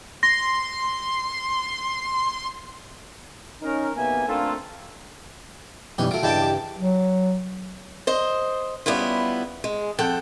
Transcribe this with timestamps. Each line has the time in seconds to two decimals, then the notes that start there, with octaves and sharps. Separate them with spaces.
0.23 C6 A#6
3.62 C#4 D#4 A#4
3.96 B1 C3 A#3 B3 E5 G#5
4.28 A3 A#3 C4 D4 F4 A4
5.98 F#2 B2 E3 G3 C#4 D#4 G4
6.11 F#3 A3 F4 D7
6.23 G2 C#3 E3 E4 D#5 F#5 G5 A5
6.41 G4
6.76 F#3
8.07 C5 D#5
8.86 G3 B3 C#4 E4 F4
9.64 G#3
9.99 F2 F3 A4 F#5 G5